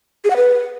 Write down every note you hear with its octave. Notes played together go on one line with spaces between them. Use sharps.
G#4
F#5
B4